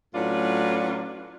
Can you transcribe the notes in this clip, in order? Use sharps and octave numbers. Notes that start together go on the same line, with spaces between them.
A2 F#3 C#4 D4 F4 B4